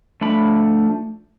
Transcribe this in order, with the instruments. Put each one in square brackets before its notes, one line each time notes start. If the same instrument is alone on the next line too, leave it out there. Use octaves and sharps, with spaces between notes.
[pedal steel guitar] F3 A3 D4 B5